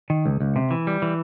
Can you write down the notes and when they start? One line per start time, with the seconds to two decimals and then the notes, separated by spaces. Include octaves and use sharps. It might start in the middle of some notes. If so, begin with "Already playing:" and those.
0.10 D#3
0.26 C#2
0.40 C#2
0.56 C3
0.71 E3
0.87 G3
1.02 E3